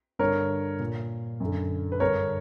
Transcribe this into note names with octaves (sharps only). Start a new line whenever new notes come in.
G2 D3 A#4 C#5
A#2
F#2
D3
B4
G2 D3 A#4 C#5